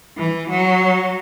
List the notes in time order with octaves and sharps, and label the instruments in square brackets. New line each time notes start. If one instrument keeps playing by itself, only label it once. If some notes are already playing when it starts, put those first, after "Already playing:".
[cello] E3
F#3